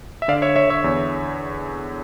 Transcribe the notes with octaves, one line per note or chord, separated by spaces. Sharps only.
E5
D3 D5 F5
C#5 E5
D3 C#5 E5
C#5 E5
E2